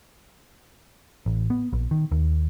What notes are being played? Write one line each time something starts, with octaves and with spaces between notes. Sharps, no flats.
A1
B3
A#1
D#3
D#2